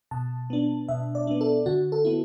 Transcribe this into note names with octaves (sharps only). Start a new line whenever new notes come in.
B2 A5
B3 D4
B2 E5
D5
B3 D4
A4
D3 F#4
A4
B3 E4